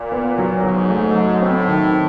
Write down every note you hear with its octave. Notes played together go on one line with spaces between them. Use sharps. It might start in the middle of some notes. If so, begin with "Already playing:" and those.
Already playing: A#2
B3
F#3
G#2 F#3
A3
F#3
A2 C4
D#3